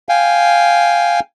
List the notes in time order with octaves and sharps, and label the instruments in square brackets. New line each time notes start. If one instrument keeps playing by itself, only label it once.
[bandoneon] F5 G5 G#5